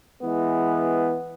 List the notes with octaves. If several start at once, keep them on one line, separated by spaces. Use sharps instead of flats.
E3 G#3 B3